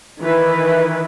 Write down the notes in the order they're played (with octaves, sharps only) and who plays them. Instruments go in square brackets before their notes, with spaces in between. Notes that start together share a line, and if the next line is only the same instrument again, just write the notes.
[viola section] D#3 E3 E4 B4